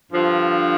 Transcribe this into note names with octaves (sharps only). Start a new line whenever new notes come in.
G2 D3 F3